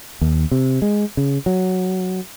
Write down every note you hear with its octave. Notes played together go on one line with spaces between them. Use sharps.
D#2
C3
G#3
C#3
F#3